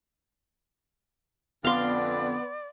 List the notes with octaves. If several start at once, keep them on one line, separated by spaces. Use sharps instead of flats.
F2 D3 B3 D5 F5 C6